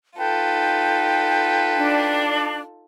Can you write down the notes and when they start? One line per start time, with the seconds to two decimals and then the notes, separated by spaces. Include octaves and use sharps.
0.19 D#4 F4 A4 B4 G5
1.76 D4